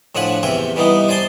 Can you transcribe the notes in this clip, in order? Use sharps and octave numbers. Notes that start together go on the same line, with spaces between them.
A2 F3 D4 F#5 G#5 B5
E2 C3 E5 G5 G#5
E3 G3 B3 D#4 E4
C5 D5 G#5 A5 C6